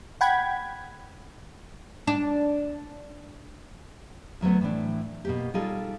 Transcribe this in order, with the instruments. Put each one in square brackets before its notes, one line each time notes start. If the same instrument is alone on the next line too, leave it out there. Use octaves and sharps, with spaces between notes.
[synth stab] F#5 G5 B5 G#6
[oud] D4
[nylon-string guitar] D2 F#3 A3 B3
A2 E3 D4
B2 A#3 G4
G3 D#4 F4 G#4 A4